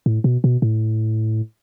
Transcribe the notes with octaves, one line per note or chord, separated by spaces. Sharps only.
A2
B2
B2
A2